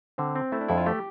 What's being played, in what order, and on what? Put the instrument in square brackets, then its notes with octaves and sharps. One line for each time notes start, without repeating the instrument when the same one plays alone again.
[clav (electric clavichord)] D3 [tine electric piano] C4
[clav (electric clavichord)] C4
[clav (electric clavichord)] A3 [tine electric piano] E4
[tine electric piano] D4
[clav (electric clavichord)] F2 [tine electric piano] E4
[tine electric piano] F4
[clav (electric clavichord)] A3 [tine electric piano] G4